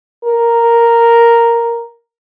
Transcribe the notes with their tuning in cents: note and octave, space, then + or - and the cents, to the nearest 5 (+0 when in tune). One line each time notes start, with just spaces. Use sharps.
A#4 +0